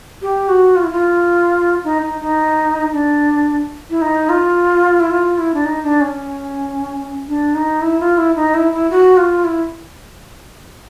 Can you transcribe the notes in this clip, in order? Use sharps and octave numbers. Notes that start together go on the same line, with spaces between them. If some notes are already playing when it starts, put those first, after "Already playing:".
G4
F#4
F4
E4
F4
D#4
D#4
D#4
D4
E4
D#4
F4
E4
F4
E4
D4
D#4
D4
C#4
D4
D#4
E4
F4
E4
D#4
E4
E4
F#4
F4
E4